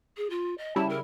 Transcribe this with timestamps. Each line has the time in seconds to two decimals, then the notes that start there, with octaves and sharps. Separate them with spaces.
0.17 G#4
0.30 F4
0.58 D#5
0.76 C#3 G3 E4 A5
0.89 A#4